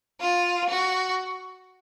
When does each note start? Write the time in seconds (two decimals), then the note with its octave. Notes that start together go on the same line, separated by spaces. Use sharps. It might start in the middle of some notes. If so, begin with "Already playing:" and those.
0.21 F4
0.69 F#4